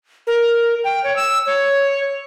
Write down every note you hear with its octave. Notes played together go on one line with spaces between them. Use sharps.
A#4
G5
C#5
E6
C#5